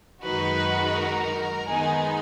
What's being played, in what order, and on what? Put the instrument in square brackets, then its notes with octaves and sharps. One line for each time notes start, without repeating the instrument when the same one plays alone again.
[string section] F#2 D#3 G#3 D#4 F#4 [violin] B4
[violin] A#4
[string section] D#3 G#3 B3 D#4 [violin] G#4